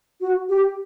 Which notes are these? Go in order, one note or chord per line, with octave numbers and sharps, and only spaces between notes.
F#4
G4